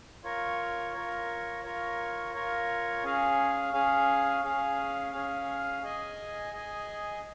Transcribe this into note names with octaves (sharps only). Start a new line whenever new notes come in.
F4 A#4 C#5
F4 A#4 C#5
F4 A#4 C#5
F4 A#4 C#5
C#4 G#4 F5
C#4 G#4 F5
C#4 G#4 F5
C#4 G#4 F5
G#4 D#5 G#5
G#4 D#5 G#5